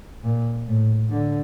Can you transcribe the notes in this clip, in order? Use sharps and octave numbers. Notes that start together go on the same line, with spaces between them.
A#2
A2
D3